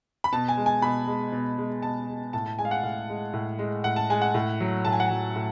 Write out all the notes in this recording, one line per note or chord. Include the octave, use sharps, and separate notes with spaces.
B5
B2 A5
G#5
G#3
G#5
B2 B5
G#3
B2
G#3
B2 A5
G#3
A2 A5
A5
G#3 G#5
F5
F#5
A2 F5
G#3
A2
G#3
A2 F#5
A5
G#3 G#5
F#5
A2
F#3
A2 A5
G#5
F#5
F#3 G#5
A2